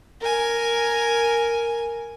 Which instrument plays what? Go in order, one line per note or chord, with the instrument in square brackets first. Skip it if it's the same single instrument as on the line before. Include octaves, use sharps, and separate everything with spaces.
[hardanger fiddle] A#4 G#5